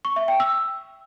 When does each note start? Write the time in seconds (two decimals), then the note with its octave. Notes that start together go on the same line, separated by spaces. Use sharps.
0.05 C#6
0.16 E5
0.28 G5
0.40 E6